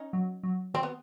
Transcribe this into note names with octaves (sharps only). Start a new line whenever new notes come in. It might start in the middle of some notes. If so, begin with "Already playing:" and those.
Already playing: C#4 D#4
F#3
F#3
D#3 C4
B3